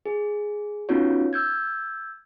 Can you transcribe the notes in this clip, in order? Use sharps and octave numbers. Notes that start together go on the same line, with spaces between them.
G#4
B3 C#4 D#4 F4 F#4 C#5
E6 G6 G#6